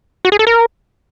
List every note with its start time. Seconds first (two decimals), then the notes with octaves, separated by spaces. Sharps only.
0.25 F#4
0.32 G#4
0.39 A4
0.47 A#4